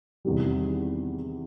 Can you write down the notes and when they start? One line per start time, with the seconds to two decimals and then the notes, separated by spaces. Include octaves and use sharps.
0.25 E2 C3 D#3 G3